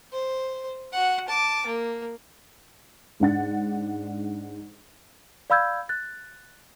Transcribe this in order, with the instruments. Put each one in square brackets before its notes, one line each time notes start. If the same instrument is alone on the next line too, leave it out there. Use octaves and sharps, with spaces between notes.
[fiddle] C5
F#4 F#5
A5 D6
A#3
[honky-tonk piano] G#2 D4 F#5 A6
[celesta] D5 F5 B5 E6 G6 G#6
F#6 A6